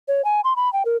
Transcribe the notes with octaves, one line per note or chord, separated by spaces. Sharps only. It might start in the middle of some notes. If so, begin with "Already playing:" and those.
C#5
G#5
C6
B5
G5
A#4